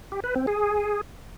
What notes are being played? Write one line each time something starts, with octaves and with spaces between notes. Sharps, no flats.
G4
B4
C4
G#4